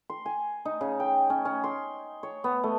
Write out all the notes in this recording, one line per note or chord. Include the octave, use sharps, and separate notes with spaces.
C6
G#5
D#4
C#3
G5
C#4
C#4
C6
C#5
B3
A3